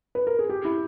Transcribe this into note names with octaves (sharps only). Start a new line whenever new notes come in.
B4
A#4
G#4
G4
E4